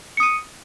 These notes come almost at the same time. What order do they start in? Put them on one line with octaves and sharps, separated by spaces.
C#7 D#6 D#7